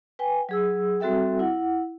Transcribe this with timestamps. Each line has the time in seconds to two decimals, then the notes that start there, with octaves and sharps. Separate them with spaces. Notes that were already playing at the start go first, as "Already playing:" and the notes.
0.19 B4 G5 G#5
0.49 F#3 G#4 E6
1.00 G3 C4 F#4 A4 E5 G5
1.39 E4 F#5